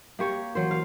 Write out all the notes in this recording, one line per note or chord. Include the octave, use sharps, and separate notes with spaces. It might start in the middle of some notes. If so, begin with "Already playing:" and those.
A#3 G4 C#5
E3 F#3 A#4 C5
F5